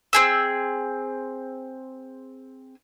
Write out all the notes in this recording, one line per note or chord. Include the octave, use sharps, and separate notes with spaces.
C4 G#4 E6